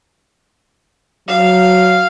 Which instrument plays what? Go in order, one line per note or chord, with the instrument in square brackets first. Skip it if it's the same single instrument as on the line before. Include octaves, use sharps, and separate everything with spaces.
[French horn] F#3 [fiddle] F5